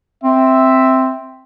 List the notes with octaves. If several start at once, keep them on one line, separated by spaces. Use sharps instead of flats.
C4 E5